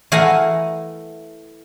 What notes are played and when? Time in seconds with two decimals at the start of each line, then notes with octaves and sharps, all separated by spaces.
0.12 E3 A3 F5 F#5 G#5 A#5